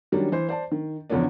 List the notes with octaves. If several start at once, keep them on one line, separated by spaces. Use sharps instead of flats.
D#3 F#3 G3 C#4 D4
E3 C5
C5 D5 A5
D#3
E2 C#3 F3 B3 C#4 D4